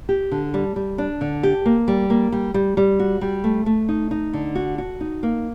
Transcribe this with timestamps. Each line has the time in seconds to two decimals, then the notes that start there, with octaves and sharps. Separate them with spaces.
0.09 G4
0.31 D3
0.54 G3
0.76 G3
0.98 D4
1.21 D3
1.43 G4
1.66 A#3
1.88 G3
2.10 A#3
2.32 G3
2.54 G3
2.77 G3
2.99 F#4
3.21 G3
3.44 A3
3.66 A3
3.89 D#4
4.11 D#4
4.33 D3
4.55 F#4
4.78 F#4
5.01 D#4
5.23 A#3